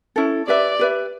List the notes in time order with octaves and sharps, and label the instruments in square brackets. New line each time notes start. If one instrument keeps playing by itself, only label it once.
[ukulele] C#4 E4 A4
[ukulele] G4 B4 E5 [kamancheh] D5
[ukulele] G4 B4 E5